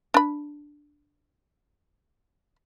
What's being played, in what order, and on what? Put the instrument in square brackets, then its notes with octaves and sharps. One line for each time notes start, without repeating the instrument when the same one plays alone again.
[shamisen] D4 B5